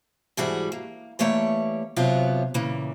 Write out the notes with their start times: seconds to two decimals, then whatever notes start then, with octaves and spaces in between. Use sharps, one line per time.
0.37 G#2 E3 G3 F#4 G#4
0.72 A#3
1.19 E3 G3 A3 A#3 C#5
1.96 D#2 C3 F#3 B3 F4 C#5
2.54 A#2 C#3 E3 A#3